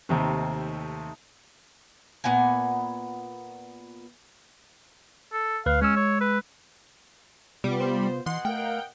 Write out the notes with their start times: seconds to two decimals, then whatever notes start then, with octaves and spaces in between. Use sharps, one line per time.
0.09 D#2 C3 A3 C4 D#4
2.24 A#2 B3 F#5 G#5
5.33 A4
5.66 D2 B4 F5 F#6
5.82 G#3 C#4 E6
5.96 C#5
6.21 B4
7.64 C3 G3 B3 F4
7.81 C5
8.26 B2 E3 D#5 F#5 C6
8.45 A3 A#4 F5 G5 F6